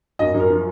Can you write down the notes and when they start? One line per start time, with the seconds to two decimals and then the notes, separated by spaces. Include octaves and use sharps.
0.19 F#2 D#5
0.34 F#2
0.40 A#4
0.50 F3